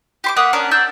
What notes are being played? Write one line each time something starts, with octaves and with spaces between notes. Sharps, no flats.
G4 C6 D6
A#3 E5 F#5 D#6
C#4 D4 A#4
D4 E6 G6